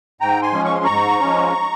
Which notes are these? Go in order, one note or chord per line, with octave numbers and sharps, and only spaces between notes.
G#2 G5 A#5
G#5 C6
F3 G#3 C#4
C#6
C6
G#2 A#5 C#6
F3 G#3 C#4